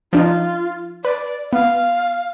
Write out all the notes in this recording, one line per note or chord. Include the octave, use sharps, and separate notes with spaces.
F3 D4 D#4 F4
B4 D5
B3 F5